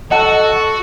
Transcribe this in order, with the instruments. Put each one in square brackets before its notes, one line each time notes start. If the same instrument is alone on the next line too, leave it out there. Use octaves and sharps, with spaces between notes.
[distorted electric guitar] F#4 [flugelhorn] A4 [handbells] D#5 F#5 A5